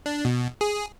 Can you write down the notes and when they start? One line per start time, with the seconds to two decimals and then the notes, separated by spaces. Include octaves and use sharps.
0.06 D4
0.25 B2
0.61 G#4